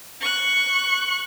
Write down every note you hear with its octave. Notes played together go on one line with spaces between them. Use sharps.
C#6 F#6